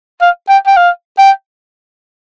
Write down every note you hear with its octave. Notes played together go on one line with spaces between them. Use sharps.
F5
G5
G5
F5
G5